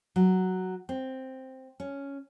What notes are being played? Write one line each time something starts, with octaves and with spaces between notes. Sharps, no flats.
F#3
C4
C#4